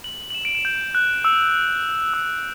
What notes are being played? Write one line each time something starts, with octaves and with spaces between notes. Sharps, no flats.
F#7
F#7
E7
D7
E7
G6
F#6
E6
E6